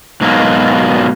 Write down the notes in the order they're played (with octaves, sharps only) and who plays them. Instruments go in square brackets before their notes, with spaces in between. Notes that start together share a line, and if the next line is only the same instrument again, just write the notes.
[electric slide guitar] G#2 B2 F#3 A#3